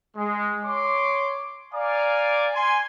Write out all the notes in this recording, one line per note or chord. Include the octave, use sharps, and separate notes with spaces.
G#3
C#5 C6 D6
D5 F5 G#5 A#5 D6
G#5 C6